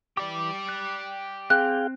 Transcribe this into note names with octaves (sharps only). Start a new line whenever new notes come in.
E3 G4 D5 D6
F#6
C4 G#4 F5 G5 F#6